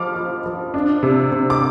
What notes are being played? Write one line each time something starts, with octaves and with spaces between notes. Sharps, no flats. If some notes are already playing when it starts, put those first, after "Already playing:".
Already playing: F3 D6 F6
F3
F3
D4
C3
C3
D6